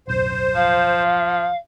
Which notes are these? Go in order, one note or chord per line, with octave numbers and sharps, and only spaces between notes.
D1 B1 F#2 C5
F3 F5